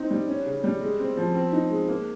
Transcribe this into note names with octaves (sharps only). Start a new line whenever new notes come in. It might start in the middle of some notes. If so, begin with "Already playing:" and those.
Already playing: C4 D#4
G3
C#4
C#3
G3
G#3
C4
F3
C4
D#4
G#3
A#3